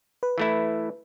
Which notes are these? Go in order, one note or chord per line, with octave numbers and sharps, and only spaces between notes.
B4
E3 A3 E4